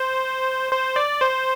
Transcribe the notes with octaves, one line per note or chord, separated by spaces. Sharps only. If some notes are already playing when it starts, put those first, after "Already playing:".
Already playing: C5
C5
D5
C5